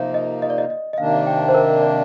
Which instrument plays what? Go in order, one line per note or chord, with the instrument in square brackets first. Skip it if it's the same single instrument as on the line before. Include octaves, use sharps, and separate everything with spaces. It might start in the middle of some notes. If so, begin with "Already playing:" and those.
Already playing: [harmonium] C3 F3 A#3 D#4
[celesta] D#5
D#5
D5
D#5
D#5
D#5
[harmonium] C3 D#3 A#3 D4 [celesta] F5
[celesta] G5
C5
A#4
D5